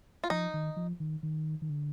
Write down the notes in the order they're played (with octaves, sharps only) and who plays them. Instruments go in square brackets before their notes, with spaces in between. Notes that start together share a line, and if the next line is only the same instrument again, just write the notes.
[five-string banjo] F4
[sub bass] F3 [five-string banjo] D#4
[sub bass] D#3
F3
D#3
D#3
D#3
D3